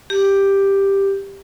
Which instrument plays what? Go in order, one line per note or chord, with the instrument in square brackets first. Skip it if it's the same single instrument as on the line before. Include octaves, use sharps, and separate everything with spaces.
[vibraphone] G4